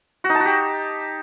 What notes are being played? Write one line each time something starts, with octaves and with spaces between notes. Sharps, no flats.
F#4
D#4
A5
F#4
G4